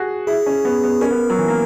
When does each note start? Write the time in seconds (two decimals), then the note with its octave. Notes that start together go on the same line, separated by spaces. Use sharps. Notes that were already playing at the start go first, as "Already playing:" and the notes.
Already playing: F#4 G#4
0.27 E4 G#4
0.46 C#4
0.65 B3
0.83 B3
1.01 C#4 A#4
1.11 B3
1.30 F#3
1.39 E3
1.48 A#3